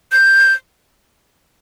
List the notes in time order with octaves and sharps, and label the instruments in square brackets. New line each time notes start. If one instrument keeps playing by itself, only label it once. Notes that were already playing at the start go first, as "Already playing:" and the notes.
[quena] G6